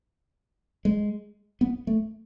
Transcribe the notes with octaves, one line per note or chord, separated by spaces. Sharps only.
G#3
B3
A3